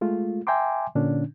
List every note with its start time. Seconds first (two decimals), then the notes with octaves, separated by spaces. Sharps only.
0.01 G#3 A3 F4
0.47 E5 G5 G#5 A#5 C6 D6
0.95 A#2 D3 C#4 D4